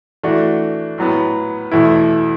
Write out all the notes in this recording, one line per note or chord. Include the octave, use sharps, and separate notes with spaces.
E3 A3 D4 F#4
A2 F#3 B3
E2 B2 A3 E4